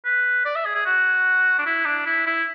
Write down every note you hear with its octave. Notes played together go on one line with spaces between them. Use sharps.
B4
D5
E5
G#4
G#4
F#4
D4
E4
D4
E4
E4